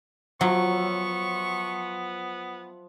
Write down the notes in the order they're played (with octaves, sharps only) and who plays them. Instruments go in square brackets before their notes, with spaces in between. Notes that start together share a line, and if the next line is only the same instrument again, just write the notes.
[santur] F3 E5 [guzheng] F#3 [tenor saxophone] B3 [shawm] C#6